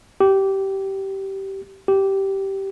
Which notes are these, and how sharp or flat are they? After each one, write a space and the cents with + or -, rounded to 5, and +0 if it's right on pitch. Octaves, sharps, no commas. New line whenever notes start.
G4 -15
G4 -10